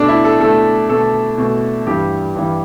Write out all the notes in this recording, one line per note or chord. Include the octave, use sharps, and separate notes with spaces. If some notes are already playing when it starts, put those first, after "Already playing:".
Already playing: B2 A3 D4
E4
A4
B2 A3 A4
B2 A3 A4
B2 A3
G2 E3 G3 G4
G2 E3 G3